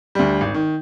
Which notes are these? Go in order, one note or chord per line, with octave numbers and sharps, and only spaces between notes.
D2 G3
G#1
D#3